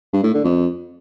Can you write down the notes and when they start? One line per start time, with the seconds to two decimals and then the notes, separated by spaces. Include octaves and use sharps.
0.13 G2
0.24 A2
0.34 D3
0.44 F2